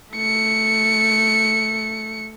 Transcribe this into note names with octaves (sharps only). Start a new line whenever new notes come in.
A3 C#7